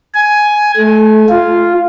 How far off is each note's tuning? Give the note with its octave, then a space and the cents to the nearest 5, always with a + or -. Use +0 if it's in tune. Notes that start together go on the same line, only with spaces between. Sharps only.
G#5 +10
A3 -25
F4 -5